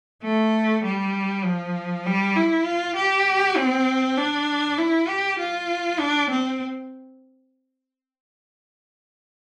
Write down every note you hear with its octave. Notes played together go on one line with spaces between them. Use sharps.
A3
G3
F3
G3
E4
F4
G4
C4
D4
E4
G4
F4
D4
C4